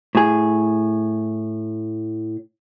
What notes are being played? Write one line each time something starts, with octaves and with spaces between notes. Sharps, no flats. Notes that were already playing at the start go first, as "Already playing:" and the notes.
A2 G#4